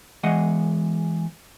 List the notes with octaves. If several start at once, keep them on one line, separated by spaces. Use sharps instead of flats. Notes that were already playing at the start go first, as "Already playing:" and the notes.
E2 E3 G#3 D#5 F#5